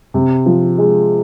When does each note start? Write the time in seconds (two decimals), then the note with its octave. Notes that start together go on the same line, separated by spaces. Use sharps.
0.14 C3
0.46 F3
0.78 G#3